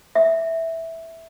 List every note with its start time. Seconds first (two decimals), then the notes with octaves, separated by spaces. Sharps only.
0.15 E5